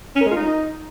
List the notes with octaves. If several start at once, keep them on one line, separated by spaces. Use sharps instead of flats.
C#4
A#4
G#3
F4
D#4